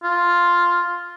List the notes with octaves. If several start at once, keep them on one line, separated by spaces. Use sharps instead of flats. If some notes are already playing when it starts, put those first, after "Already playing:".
F4